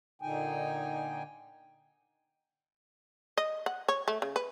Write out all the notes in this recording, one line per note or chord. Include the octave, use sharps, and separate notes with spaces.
A#2 D3 D#4 G5 G#5
D#5
F#5
C#5
A3
C#3
B4